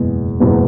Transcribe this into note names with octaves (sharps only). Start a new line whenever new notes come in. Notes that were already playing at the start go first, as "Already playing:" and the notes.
Already playing: F#1 E2 B2 G#3
F#1 E2 B2 G#3